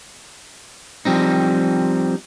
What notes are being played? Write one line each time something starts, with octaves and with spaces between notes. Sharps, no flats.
F3 G3 C4 D#4